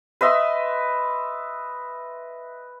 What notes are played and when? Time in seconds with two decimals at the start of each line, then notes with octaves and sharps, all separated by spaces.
0.21 B4 D#5 E5 C6